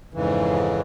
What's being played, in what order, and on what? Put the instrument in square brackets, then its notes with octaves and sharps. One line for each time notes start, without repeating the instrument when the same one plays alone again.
[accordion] F2 G#2 C#3 E3